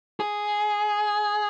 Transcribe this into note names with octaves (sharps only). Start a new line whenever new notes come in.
G#4